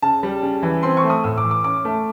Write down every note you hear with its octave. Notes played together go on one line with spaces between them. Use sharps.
C#3 A5
G3
C#3
E3
C4 C6
C#6
A3
D#6
A2 E6
D6
E3
D6
C#4 D6
A3